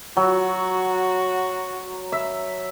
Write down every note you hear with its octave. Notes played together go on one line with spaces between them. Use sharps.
F#3 F#4
E5